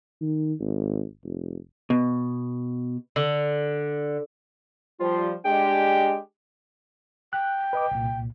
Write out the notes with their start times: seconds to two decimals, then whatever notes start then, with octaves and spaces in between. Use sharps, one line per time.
0.21 D#3
0.60 G#1
1.24 F1
1.90 B2
3.16 D3
5.00 F3 G3 F4 C5
5.45 G#3 D4 G4 G5
7.33 G5 F#6
7.73 B4 D#5 D6
7.91 C2 A#2